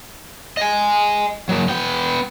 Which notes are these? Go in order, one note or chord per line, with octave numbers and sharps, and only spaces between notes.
D#5 G#5
F#3 A#3
B3 G5